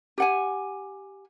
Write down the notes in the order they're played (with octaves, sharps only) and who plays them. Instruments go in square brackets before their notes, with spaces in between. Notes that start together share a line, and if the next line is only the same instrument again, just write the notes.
[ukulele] G4 F#5 G#5